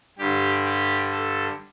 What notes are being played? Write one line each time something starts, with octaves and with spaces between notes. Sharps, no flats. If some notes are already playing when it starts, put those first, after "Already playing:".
G2 D3 G4
G4
A4